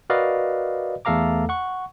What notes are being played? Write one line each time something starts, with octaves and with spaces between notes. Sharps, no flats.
F#4 A#4 B4 D5 D#5 F5
E2 A3 A4 F5 A#5 D6
F#5 C#6